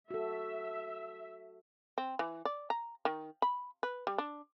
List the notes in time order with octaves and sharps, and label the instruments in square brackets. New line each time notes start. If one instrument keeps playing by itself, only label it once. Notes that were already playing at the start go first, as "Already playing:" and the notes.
[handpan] F#4 A4 [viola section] E5
[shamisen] C4
E3
D5
A#5
D#3
B5
B4
G3
D4